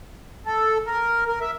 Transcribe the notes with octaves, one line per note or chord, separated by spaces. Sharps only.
A4
A#4
A#4
E5